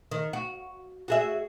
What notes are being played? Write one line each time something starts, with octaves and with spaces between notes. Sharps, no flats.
D#3
F#4
F#4 G#4 E5